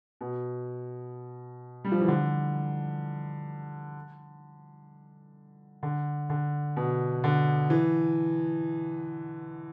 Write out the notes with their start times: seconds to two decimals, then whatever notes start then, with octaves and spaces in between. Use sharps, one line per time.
0.21 B2
1.84 G3
1.92 F3
2.01 E3
2.08 D3
5.83 D3
6.30 D3
6.77 B2
7.24 D3
7.70 E3